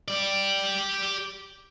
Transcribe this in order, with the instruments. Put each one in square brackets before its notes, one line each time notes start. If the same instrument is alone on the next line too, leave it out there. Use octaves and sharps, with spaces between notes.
[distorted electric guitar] G4 D5